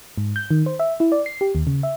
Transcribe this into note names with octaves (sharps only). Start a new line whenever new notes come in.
G#2
G6
D#3
C5
E5
E4
D5
C7
G4
D#2
C#3
E5